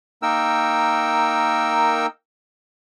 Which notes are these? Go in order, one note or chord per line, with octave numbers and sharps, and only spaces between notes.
A#3 D#4 A#4 G5 E6